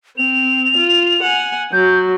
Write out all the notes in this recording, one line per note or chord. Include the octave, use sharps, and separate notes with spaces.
C4 F7
F4
F#5 G#5
F#3 G6